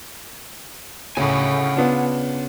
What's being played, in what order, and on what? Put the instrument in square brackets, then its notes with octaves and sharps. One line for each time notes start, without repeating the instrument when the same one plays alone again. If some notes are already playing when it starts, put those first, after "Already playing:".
[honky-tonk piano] D2 A2 [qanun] C#3 [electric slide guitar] F#5 G#5
[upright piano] B3 F4 [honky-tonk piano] D4